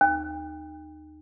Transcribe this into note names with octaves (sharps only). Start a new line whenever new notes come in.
D#2